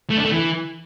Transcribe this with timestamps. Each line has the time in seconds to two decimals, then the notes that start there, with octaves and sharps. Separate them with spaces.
0.10 A3
0.17 D4
0.25 A3
0.32 E3